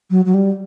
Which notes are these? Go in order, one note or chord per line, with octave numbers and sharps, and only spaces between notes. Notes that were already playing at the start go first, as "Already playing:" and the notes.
F#3
F#3
G3